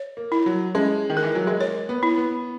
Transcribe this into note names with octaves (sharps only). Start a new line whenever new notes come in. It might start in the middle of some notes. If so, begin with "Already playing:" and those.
Already playing: C#5
A#3
E4
F#3
G#3 C#4
D#3
A#4
E3
F#3
G#3
A#3 C#5
B3
E4
B3